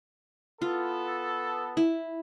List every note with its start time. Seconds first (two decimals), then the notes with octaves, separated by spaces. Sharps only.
0.62 B3 F4 A4
1.77 E4